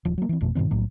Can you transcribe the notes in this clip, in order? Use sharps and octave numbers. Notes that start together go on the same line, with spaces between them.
D#1 F3
F#3 A#3
E3 C4
G1 F2 B2 A3
G2 B2 D#3 C4
B1 A2 F#3